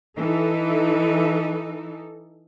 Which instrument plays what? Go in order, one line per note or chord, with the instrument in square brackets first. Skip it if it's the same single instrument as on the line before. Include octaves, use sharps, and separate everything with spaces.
[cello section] E3 D#4 A4